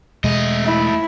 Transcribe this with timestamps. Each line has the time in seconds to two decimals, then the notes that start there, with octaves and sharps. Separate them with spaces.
0.24 E2 B2 G#3 A3 D#5
0.65 E4